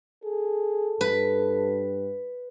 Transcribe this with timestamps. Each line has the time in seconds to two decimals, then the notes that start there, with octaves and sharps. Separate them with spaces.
0.24 G#4 A4
1.01 G2 B4